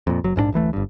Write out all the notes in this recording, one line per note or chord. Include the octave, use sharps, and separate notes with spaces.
F2 A#2
F#1 F#3
A#1 G#2 G#3 D4
D1 A1 E3 A3
G1 G2